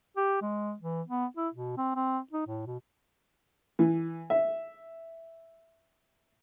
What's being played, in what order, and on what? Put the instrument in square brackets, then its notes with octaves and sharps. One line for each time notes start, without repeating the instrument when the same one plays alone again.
[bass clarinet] G4
G#3
E3
B3
E4
B2
C4
C4
D#4
A2
B2
[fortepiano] E3
E5